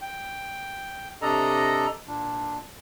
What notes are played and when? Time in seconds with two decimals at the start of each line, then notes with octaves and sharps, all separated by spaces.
0.01 G5
1.22 C3 D4 A4 D#5 A#5
2.08 A#2 D4